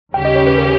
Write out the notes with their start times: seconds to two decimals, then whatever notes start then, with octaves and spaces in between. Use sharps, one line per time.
0.14 D#2 C#3 G3 C#4 G4 G5
0.25 D#5
0.36 C#5
0.47 B4
0.58 A#4